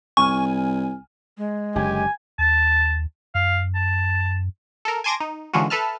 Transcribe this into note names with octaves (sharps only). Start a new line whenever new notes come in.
C2 G#5 C#6 F6
G#3
F#1 D3 G4 G#5
D#2 A5
F#2 F5
A5
A4 A#4
G#5 A5 C6 D6 G#6 A#6
D#4
D3 E3 G#3 C#4 F4 F#4
A4 B4 E5 A5 F6